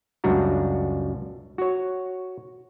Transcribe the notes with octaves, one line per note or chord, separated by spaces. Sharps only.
C#2 F#2 G3 D4 F#4 A#5
F#4 C#5